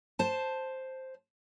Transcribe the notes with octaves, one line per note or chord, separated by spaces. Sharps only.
C5 A5